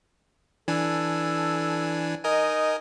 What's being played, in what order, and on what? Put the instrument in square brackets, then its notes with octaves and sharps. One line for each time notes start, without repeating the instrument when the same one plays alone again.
[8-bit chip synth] E3 D4 G#5 [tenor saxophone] A4
[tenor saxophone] D#4 [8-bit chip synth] A#4 D#5 G#5